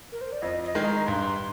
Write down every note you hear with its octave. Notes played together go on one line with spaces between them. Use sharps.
A#4
C5
D5
F2 D#5
D#5
D#3 G#3
A#5
G2 C6